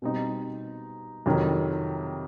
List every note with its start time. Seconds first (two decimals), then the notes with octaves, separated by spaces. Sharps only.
0.02 B2 G3 C4 D#4
1.26 F2 C3 D#3 F#3